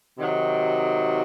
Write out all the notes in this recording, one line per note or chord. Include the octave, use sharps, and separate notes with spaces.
C3 D#3 F#3